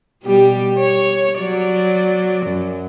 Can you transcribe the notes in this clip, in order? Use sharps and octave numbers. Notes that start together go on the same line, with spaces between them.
B2 G3 G4
C#5
F#3 D5
F#2